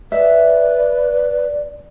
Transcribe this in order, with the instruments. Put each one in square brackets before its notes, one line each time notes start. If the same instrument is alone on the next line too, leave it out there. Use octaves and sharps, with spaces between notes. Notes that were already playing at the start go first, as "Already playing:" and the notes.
[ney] B4 [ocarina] D5 [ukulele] E5